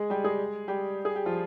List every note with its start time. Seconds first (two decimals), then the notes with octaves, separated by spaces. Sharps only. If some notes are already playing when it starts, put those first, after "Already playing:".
Already playing: G#3 G#4
0.10 G3 G4
0.24 G#3 G#4
0.68 G3 G4
1.05 G#4
1.16 G4
1.26 F3 F4